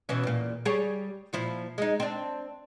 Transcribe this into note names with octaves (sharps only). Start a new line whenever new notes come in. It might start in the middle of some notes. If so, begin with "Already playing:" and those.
B2 E3 C#4
E2 A#2
G3 G#4 C#5
A#2 F3 E4
G#3 D#4
C4 D4